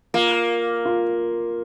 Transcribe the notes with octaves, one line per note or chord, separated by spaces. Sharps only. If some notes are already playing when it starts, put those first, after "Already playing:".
A#3 F4
F4